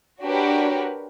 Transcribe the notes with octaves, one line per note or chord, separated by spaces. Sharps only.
D4 F#4 G4 A#4 B4 C#5